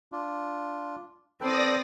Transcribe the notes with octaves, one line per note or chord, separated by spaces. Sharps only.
D4 F4
C4 A4 B4 C5 D5 G5 D#6 A#6